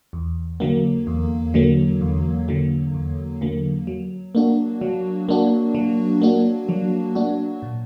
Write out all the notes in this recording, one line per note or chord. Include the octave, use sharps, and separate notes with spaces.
E2
D3 F#3 A#3
E2
D3 F#3 A#3
E2
D3 F#3 A#3
E2
D3 F#3 A#3
F#3
A#3 D4 F#4
F#3
A#3 D4 F#4
F#3
A#3 D4 F#4
F#3
A#3 D4 F#4
A#2